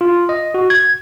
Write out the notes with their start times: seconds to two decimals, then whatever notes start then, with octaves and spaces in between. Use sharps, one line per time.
0.01 F4
0.29 D#5
0.54 F#4
0.70 G#6